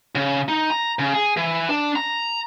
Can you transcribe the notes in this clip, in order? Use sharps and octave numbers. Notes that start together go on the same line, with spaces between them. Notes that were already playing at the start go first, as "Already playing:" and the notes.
C#3
D#4
A#5
C#3
G#4
E3
D4
A#5